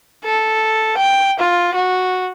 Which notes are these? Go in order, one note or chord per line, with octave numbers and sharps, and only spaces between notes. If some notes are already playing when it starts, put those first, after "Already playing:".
A4
G5
F4
F#4